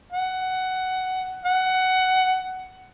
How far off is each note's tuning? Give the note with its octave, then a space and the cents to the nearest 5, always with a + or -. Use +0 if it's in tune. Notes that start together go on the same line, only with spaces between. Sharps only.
F#5 +10
F#5 +15